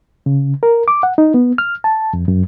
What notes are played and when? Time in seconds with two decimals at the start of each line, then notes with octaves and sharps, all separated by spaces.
0.26 C#3
0.63 A#4
0.88 D6
1.03 F#5
1.18 D#4
1.34 B3
1.58 F6
1.84 A5
2.13 F2
2.28 F#2